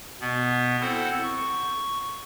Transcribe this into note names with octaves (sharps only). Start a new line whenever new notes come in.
B2 B3
C4 E4 A4 C5 F#5
C#6